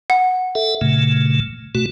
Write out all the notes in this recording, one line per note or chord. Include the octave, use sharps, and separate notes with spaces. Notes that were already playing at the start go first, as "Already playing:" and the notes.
F#5
A4 E5
A#2 C#3 A3
B2 A3 F#4